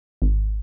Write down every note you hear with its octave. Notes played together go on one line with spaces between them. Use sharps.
G#1